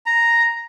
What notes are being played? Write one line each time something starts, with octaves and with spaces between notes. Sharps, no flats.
A#5